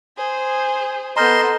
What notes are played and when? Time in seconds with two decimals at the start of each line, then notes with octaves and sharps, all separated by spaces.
0.18 G#4 C5
1.17 B3 A4 D#5 A#5 C6 F6 G6